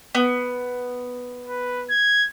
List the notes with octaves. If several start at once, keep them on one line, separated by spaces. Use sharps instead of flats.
B3
B4
G#6